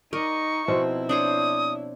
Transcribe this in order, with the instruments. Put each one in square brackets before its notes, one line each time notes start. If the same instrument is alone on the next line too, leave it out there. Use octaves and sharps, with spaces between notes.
[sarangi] D#4 [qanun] A#4 [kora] D5 D#5 [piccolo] C#6
[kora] B2 F3 C4 [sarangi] E4
[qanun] D4 C5 C#5 [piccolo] D#6